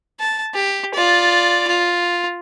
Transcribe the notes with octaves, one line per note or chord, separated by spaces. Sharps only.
A5
G4
F4 D5
F4